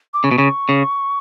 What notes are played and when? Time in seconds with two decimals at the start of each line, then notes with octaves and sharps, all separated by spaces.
0.14 D6
0.24 C#3 C#6
0.31 B2
0.38 C#3
0.69 C#3